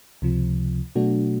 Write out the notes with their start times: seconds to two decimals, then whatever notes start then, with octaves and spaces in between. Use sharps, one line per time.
0.22 C#2 C3 F3
0.96 B2 F#3 A3 D4 F#4